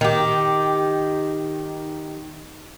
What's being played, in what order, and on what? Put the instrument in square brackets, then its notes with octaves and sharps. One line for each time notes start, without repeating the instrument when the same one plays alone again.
[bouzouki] D#3 G4